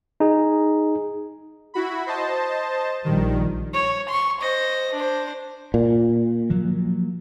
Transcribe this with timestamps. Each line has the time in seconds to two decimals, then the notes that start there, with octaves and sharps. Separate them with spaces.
0.20 D#4 G#4
1.74 E4 F#4 B5
2.06 C5 D#5 A5
3.05 A#1 D#3 G3
3.74 C#5
4.09 C6 C#6
4.40 C5 D#5
4.94 D4 C5
5.74 A#2
6.50 F3 F#3 A#3